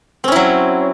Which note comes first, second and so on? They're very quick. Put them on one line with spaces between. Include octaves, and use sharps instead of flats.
C4 C#4 E4 F#3